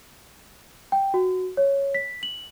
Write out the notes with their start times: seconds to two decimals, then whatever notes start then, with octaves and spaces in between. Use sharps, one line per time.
0.92 G5
1.14 F#4
1.57 C#5
1.94 B6
2.23 F#7